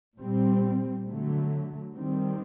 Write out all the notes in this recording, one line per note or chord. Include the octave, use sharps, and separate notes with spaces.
A#2 G3 C4
D3 F#3 A3
D#3 G3 C4